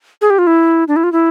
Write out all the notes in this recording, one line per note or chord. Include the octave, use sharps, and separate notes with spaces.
G#4
G4
F4
E4
D4
E4
F4
E4